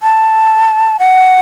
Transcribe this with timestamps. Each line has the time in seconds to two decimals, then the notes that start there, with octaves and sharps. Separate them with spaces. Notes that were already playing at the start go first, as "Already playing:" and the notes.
0.02 A5
0.99 F#5